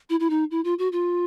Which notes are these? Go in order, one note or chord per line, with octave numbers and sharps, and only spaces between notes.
E4
E4
D#4
E4
F4
F#4
F4